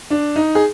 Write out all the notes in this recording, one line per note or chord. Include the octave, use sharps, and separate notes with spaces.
D4
D#4
G#4